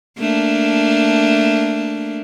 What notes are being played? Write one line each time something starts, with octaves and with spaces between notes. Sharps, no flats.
A3 A#3 D4